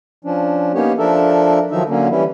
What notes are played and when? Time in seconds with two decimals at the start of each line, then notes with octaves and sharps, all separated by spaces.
0.25 F3 C#4 D4
0.74 A#3 B3 C#4 D#4 G4 C#5
0.99 F3 D4 A4 A#4 E5
1.71 D#3 F3 F#3 D#4 E5
1.89 D3 F#3 A#3 C#4
2.10 E3 G3 C#4 E4